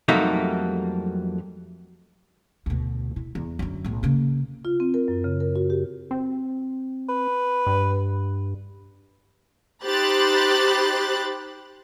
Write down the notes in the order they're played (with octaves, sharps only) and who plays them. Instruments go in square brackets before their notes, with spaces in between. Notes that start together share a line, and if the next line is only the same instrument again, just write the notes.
[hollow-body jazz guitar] F2 F#3 G3 A3 A#3 D#4
[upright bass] D2 B2
E4
E2
F#2 D3
B1 A2
C#3 A#3
[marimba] F4
C4
A#4
F#2
C#3
A#4
F#4
G4
[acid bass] C4
[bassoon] B4
[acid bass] G2
[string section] D#4 G4 C5 B5 F#6 A6